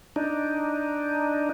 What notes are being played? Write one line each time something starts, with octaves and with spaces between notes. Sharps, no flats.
D4 D#4